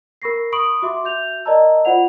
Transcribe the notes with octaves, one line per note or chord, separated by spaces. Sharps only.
A#4 B5 C#6 A#6 C7
B5 C#6 D#6 D7 F#7
F#4 E5 C6 D6
F#4 E5 G6 F7
A#4 D5 D#5 A5 A#5 E6
F4 C5 D5 F#5 F7